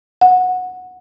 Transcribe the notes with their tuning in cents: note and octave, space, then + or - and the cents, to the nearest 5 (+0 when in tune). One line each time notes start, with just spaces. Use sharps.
F#5 -10